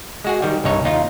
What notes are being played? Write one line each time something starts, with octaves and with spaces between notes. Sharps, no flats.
G#3 F#4 G#4
D#3 G3
C2 G2 D#4 C#5
D#2 D#4 F4